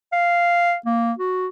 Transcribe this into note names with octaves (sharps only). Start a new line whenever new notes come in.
F5
A#3
F#4